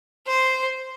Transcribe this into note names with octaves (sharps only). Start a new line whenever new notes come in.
C5